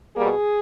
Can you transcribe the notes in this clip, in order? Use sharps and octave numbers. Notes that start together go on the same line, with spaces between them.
B2 G3 A#3 G#4